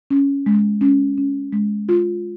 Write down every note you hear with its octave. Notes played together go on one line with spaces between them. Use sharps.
C#4
G#3
C#4
C#4
G#3
F4